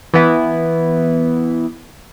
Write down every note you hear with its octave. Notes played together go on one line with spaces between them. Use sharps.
E3 B3 E4